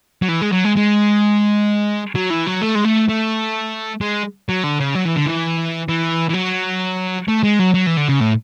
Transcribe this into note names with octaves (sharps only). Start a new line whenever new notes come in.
F#3
E3
G#3
F#3
G#3
G#3
F#3
E3
F#3
A3
G#3
A3
A3
G#3
F#3
D3
C#3
F#3
E3
D3
E3
E3
E3
F#3
A3
G#3
F#3
F#3
E3
D3
C#3
A2